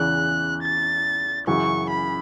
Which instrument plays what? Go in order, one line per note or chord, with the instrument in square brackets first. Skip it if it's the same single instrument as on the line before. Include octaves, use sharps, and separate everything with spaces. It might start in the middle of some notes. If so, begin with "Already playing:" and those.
Already playing: [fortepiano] E2 C#3 E3 [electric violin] F#6
[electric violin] A6
[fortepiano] F#2 C#3 E3 [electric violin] C#6
[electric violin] B5